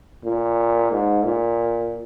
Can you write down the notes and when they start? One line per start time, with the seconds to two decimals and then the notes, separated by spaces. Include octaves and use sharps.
0.24 A#2
0.91 G#2
1.25 A#2